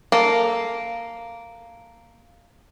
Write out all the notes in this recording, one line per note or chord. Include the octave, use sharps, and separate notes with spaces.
A#3 A4